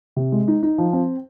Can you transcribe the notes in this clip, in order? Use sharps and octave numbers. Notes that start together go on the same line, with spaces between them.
C3
G#3
D#4
D#4
F3
C4